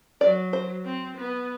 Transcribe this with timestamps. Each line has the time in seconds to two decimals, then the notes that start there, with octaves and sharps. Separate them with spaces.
0.21 F#3 D5
0.53 C5
0.85 C4
1.17 B3